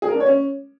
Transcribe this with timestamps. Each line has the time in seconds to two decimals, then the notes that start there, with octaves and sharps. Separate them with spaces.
0.02 G#4
0.08 A#4
0.14 D4
0.20 C#5
0.26 C#4